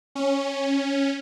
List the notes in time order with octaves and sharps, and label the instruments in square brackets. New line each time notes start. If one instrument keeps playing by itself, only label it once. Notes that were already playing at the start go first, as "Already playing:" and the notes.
[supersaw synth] C#4